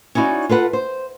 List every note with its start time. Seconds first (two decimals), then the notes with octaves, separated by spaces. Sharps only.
0.15 C#4 D#4 E4 F#4 D5
0.49 F4 A4 B4 F#5
0.73 C5